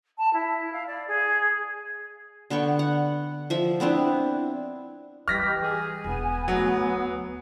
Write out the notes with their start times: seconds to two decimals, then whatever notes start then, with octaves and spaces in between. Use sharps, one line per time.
0.18 A5
0.33 E4
0.72 F5
0.87 D5
1.07 G#4
2.50 D3 B3 G5 C#6
2.79 F#5
3.50 F3 E5
3.80 B3 C4 D4 E4
5.28 E3 G3 G4 B4 D#5 F6 A#6 B6
5.62 G#4 G#5
6.04 E1 B3
6.48 D2 F#3